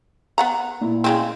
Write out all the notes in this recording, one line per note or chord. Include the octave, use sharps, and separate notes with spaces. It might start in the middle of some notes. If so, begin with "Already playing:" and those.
B3 F#5 A#5
A#2 E4
C#3 G#3 C4